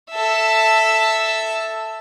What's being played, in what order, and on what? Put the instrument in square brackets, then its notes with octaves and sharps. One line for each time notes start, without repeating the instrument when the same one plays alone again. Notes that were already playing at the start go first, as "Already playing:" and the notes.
[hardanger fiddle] A4 E5